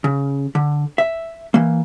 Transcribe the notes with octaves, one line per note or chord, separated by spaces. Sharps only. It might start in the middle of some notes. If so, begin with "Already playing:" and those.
C#3
D3
E5
E3 A#3